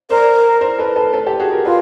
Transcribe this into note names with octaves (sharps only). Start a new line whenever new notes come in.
A#4 C5 D5
A#4 C5
A4 B4
A4 B4
A4 B4
G4 A4
F#4 G#4
G#4 A#4
F4 A4 B4